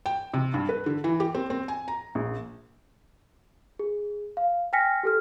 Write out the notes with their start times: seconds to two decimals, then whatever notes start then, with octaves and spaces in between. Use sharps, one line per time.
0.06 G5
0.34 C3
0.54 G2
0.69 B4
0.86 D3
1.04 E3
1.20 G4
1.35 C4
1.50 C4
1.68 G#5
1.88 A#5
2.15 A#1
3.79 G#4
4.37 F5
4.73 G5 G#5 F6 A#6 B6 C#7
5.03 G4 A4 F6